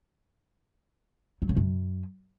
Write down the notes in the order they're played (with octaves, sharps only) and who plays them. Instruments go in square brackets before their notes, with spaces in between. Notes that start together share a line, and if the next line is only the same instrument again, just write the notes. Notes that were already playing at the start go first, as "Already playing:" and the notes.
[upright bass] F#3
C#3
F#2